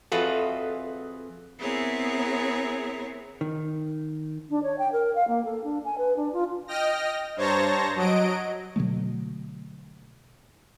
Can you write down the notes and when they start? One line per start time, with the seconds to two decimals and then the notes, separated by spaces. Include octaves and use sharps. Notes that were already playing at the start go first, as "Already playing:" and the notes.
0.12 F2 F4 F#4 G#4 A4 B4 E5 A5
1.58 B3 C4 E4 G#4 A#4 C#5
3.41 D#3
4.49 D4
4.63 C#5
4.78 G5
4.92 A#4
5.15 F5
5.27 A#3
5.44 A4
5.63 D4
5.84 G#5
5.98 B4
6.16 D4
6.33 F4
6.68 D#5 G5 F6 A#6
7.36 G2 C5 C#5 A5 A#5 A#6
7.96 F#3 D#5 D7
8.76 B2 D3 F#3 A3